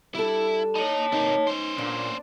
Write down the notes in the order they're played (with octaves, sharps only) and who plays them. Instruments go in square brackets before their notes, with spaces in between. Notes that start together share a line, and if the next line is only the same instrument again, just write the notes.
[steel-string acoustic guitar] G3 D4 A4 [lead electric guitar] E4
[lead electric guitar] D#4 [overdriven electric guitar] C#5 A5
[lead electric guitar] C3 A#3 [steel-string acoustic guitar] D#4
[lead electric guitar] C#4 C5
[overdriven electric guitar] A#2 [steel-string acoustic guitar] D4